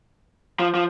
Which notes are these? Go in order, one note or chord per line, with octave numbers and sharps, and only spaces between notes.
F3
F3